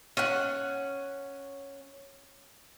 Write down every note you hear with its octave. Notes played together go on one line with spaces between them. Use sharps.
C#4 F#5